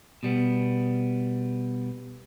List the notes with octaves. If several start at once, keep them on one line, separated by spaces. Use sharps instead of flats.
B2 G3 B3